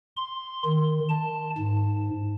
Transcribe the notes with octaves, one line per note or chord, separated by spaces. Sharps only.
C6
D#3
A5
G#2